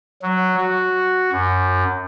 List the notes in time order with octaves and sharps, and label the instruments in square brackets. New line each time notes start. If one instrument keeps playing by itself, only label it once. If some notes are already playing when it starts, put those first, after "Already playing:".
[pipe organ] F#3
F#4
F#2